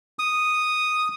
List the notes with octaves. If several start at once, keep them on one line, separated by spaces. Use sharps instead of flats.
D#6